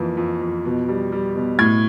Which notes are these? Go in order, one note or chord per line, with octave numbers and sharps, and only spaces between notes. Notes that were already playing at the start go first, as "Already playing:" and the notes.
Already playing: F2 E3 A#3
F2
F2
B2
G3
G3
B2
A2 G#6